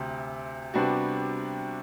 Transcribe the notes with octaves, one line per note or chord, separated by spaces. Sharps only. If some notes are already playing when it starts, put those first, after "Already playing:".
Already playing: D2 C3
C3 G3 B3 D4 F#4